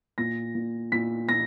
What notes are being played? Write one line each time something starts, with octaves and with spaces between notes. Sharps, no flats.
A#2 A#6
A#2
A#2 B6
A#2 A#6